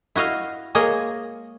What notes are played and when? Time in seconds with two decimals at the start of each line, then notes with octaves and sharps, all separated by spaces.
0.16 E4 F#4 D#5 F5
0.75 G#3 A#3 G#4 C#5 D#5